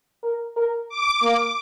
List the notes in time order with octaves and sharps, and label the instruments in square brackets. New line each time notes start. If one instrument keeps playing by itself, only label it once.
[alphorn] A#4
A#4
[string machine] D6
[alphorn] A#3